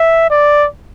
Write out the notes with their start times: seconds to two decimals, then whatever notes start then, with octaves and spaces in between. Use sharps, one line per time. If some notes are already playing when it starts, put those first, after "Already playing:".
Already playing: E5
0.30 D5